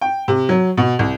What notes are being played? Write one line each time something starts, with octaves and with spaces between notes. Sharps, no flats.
G5
C3
F#3
B2
C2